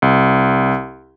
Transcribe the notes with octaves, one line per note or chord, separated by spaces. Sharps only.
C2